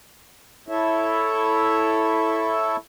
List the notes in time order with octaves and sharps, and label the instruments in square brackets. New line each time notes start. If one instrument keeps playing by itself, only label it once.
[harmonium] E4 A4 C#5 E5